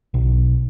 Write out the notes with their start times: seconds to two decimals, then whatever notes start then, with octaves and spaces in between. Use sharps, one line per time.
0.14 B1